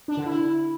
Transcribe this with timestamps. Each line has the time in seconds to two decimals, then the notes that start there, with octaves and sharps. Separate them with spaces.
0.08 D4
0.17 D3
0.26 E4